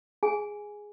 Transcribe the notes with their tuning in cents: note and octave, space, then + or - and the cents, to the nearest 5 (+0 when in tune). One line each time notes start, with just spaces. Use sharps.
G#4 +0 G#5 +0